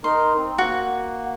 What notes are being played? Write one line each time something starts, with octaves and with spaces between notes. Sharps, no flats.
D#4 A#4 C6
C4
A#3 F#4